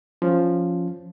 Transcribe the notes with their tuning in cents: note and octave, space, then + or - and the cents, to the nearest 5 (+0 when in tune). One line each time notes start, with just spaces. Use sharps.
F3 +0 C#4 +0